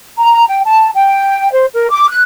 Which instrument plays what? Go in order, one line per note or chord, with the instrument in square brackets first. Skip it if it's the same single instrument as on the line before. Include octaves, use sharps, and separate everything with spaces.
[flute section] A#5
G5
A5
G5
C5
A#4
D6
F#6